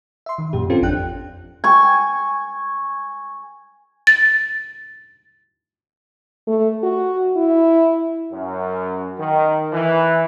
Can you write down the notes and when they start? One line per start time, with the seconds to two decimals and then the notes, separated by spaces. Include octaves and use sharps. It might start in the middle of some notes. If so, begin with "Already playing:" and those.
0.26 E5 C6
0.38 D#3
0.53 F#2 A#2 G4
0.70 C4 C#4 F4 G4 A4 C5
0.82 G#1 F2 D4 G5 F#6
1.64 G#5 C#6
4.07 A6
6.47 A3
6.83 F#4
7.37 E4
8.31 F#2
9.19 D#3
9.73 E3